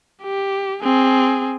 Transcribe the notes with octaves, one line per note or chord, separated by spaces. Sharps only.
G4
C4 G#4